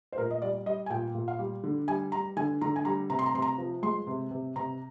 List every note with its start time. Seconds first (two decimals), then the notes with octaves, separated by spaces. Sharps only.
0.12 C5
0.18 A#2 A#4
0.31 D#5
0.42 G3 D5
0.66 G3 D#5
0.86 G#5
0.90 A#2 G5
1.15 A#2
1.28 F5
1.39 G3
1.64 D3
1.88 G3 G#5
2.12 G3 A#5
2.37 D3 G#5
2.61 D3 A#5
2.76 G#5
2.85 G3 A#5
3.10 C3 A#5
3.19 C6
3.26 A#5
3.35 C3 C6
3.42 A#5
3.58 F3
3.83 G#3 C6
4.07 C3
4.31 C3
4.56 C3 A#5